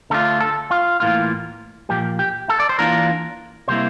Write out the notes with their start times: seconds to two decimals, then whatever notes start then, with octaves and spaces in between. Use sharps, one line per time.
0.10 D3 A3 D4 F4 A4
0.41 A4
0.71 F4
1.00 A2 E3 A#3 F4
1.89 A#2 F3 A#3 G4
2.19 G4
2.49 A4
2.60 D5
2.69 C5
2.79 E3 A#3 D4 F4 A#4
3.68 C3 G3 A#3 E4 C5